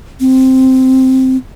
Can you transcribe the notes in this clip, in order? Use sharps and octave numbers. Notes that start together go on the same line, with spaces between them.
C4